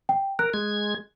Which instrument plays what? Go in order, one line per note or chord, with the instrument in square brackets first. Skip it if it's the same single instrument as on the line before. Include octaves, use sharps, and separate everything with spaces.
[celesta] G5
[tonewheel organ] A#4 [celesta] F#6
[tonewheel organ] G#3 G#6